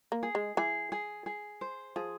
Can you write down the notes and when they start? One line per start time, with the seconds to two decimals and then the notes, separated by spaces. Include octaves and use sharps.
0.12 A#3
0.23 G#4
0.35 G#3
0.57 E3 G#4
0.92 G#4
1.26 G#4
1.61 C5
1.96 F3 G#4